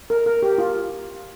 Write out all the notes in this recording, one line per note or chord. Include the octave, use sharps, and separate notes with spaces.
A#4
A#4
G4
F4